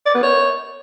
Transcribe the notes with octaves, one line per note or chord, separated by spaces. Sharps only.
D5
B3
C#5